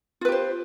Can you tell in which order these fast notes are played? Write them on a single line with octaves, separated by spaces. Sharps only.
F4 B4 G4 C5